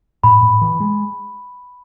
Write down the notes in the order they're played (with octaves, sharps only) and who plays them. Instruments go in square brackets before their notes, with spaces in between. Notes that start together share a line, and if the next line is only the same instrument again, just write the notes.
[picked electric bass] A2 [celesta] B5
[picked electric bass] A2
E3
G#3